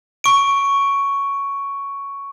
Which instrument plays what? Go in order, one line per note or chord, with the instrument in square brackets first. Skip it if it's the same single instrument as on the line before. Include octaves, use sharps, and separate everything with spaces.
[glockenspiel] C#6 D7